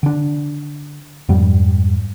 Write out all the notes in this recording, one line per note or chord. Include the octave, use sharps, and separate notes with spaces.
D3 D4
F2 G#2 G3